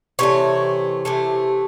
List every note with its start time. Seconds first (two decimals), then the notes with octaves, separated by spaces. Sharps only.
0.19 C3 E3 A3 C#5
1.05 C3 E3 A3